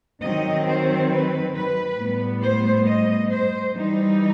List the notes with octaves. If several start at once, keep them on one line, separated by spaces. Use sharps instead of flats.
D#3 F#3 C4 D#5
C5
B4
B4
A2 G3 B3
C5
D#5
C5
E3 G3 D#4